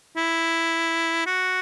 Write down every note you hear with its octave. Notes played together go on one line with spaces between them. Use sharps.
E4
F#4